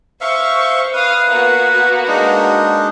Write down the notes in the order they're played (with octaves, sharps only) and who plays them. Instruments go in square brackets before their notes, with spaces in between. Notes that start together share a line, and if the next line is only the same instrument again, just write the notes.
[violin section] C5 C#6 [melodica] E5 F5
[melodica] B4 [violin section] F5 D#6
[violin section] A#3 B3 F#4
[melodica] G#3 D4 D#4